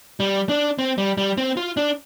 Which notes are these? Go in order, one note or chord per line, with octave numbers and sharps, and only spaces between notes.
G3
D4
C4
G3
G3
C4
F4
D4